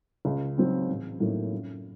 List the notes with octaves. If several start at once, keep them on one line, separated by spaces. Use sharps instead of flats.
C#2
C#3 F#3 C4 D#4
A1
A2 F#3 A#3 D#4
F#2